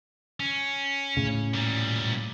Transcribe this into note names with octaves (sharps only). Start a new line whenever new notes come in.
C#4
A2 C#3
A#2 G3